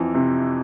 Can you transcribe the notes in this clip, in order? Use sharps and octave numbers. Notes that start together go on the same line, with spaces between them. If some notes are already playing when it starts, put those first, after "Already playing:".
Already playing: F2 E3
C3